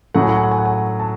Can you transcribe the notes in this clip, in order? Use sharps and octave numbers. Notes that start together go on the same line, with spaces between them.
A2 F#3 A3 F#5
G#5
F#5
G#5
F#5
G#5
F#5
G#5
F#5
A5